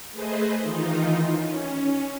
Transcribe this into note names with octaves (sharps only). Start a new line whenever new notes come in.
A3 G#4 B4 C5 D#5
D#3 E3 D#4 F4
C#4